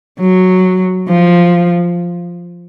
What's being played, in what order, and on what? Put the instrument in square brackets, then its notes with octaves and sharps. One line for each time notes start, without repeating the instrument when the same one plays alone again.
[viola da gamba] F#3
F3